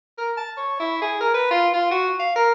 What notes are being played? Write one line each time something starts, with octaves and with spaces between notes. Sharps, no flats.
A#4
A5
C#5
E4
G#4
A#4
B4
F4
F4
F#4
F5
A#4